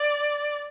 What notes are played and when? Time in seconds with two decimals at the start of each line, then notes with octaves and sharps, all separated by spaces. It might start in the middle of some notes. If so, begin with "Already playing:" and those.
Already playing: D5